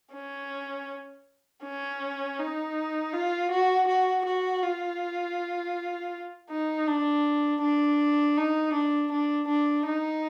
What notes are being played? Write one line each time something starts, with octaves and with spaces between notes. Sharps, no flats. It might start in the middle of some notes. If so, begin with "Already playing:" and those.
C#4
C#4
D#4
F4
F#4
F#4
F#4
F4
D#4
D4
D4
D#4
D4
D4
D4
D#4